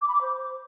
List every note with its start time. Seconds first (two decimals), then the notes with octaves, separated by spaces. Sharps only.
0.01 D6
0.08 B5
0.15 D6
0.21 C5